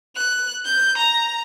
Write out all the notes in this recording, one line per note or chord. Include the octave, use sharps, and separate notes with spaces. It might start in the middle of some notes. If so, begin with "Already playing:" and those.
F#6
G6
A#5